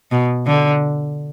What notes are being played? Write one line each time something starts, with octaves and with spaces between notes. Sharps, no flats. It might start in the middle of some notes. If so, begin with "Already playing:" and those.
B2
D3